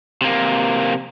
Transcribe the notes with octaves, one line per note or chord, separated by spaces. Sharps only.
C3 A#3